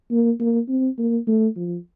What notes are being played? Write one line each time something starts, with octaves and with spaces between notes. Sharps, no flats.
A#3
A#3
C4
A#3
A3
F3